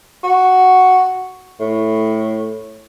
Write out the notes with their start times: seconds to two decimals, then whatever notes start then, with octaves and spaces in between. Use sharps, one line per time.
0.24 F#4
1.60 A2